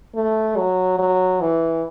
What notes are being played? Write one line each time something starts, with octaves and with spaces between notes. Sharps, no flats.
A3
F#3
F#3
E3